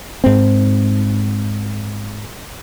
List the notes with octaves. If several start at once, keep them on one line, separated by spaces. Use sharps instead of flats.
G#2 C4